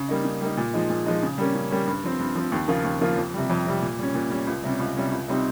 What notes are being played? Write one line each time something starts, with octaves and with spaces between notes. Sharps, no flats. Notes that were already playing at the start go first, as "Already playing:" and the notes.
Already playing: C#3
G3 A#3 D#4
C#3
G3 A#3 D#4
A#2
F3 G#3 D#4
A#2
F3 G#3 D#4
C#3
G3 A#3 C#4
C#3
G3 A#3 C#4
G2
F3 C4
G2
F3 C4
D#2
C#3 F3 A#3 F4
D#2
C#3 F3 A#3 F4
F2
C3 G3
F2
C3 G3
A#2
G3 C#4
A#2
G3 C#4
C#2
C3 G3 C#4
C#2
C3 G3 C#4
C#2
C3 G3 C4 D#4